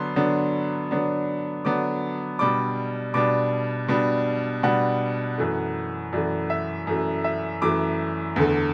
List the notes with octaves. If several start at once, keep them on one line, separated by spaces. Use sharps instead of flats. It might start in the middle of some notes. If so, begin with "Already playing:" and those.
Already playing: D3 F#3 B3 D4 C6
D3 F#3 B3 D4
D3 F#3 B3 D4
D3 F#3 B3 D4 D6
B2 G3 D4 D6
B2 G3 D4 D6
B2 G3 D4
B2 G3 D4 F#5
F#2 E3 A3
F#2 E3 A3 D5
E5
F#2 E3 A3
E5
F#2 E3 A3 D6
E2 D3 A3